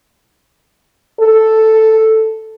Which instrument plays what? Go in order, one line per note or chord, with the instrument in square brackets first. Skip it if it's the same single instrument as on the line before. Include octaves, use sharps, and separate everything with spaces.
[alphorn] A4